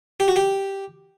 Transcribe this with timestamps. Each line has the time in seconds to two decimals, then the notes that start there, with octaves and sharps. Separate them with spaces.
0.20 G4
0.28 F#4
0.36 G4